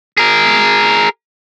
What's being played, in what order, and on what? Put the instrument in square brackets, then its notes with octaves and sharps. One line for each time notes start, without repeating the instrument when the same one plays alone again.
[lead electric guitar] G#4 A#4